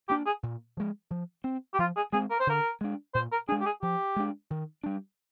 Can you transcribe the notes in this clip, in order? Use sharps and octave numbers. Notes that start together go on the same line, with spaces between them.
A#3 D4 G4
G#4
A#2
F3 G#3
F3
C4
G4
F3 F4
G#4
G#3 C4 G#4
A#4
C5
D3 A#4
G#3 D4
A#2 C5
A#4
G#3 D4 G#4
G4
G#4
F3 G4
G#3 D4
D#3
G3 D4